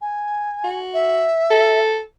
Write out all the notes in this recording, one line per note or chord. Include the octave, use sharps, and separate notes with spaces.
G#5
F#4
E5
A4